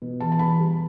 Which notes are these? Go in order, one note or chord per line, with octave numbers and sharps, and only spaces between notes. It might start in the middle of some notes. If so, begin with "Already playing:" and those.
B2
E2 A5
A5
E2 B5
G3